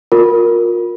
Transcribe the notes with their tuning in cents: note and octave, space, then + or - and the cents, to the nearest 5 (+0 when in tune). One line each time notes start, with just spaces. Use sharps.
F4 +30 A#4 +0